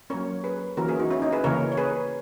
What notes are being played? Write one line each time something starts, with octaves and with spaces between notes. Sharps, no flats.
F#3 A#3 C#4 A#4 C#5
G#4 B4
E3 A#3 C#4 F#4 A#4
E4 G#4
D#4 F#4
C#4 E4
D#4
G#4 B4
C#3 E3 A#3 A#4 C#5
C#5
G#4 B4